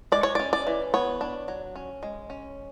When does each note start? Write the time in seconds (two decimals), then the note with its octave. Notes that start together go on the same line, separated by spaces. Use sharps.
0.12 G#3 D5
0.23 C#5
0.35 C#4 D5
0.53 D5
0.67 E3
0.94 B3 C#5
1.21 D4
1.48 F#3
1.76 C#4
2.03 G#3
2.30 C#4